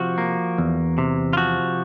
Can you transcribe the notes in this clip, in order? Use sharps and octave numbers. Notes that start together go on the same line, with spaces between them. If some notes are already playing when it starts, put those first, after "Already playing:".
Already playing: C3 F3 F#4
A#3
E2
C3
F4
F3 F#4